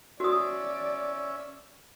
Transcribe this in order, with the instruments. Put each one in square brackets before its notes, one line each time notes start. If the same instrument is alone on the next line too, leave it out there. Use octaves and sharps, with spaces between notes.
[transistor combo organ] C#4 E5 [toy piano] F#4 D#6 [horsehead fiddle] D5